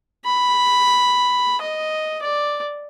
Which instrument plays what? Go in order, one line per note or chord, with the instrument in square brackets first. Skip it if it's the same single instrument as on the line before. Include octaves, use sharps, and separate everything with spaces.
[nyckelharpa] B5
D#5
D5